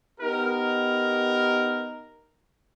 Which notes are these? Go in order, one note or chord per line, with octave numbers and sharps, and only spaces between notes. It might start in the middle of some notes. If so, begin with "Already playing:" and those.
B3 D#4 G4 A#4